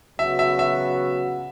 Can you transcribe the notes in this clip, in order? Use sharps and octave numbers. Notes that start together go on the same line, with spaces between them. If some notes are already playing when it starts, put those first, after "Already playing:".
C#3 F#3 B3 F#4 E5
E5
E5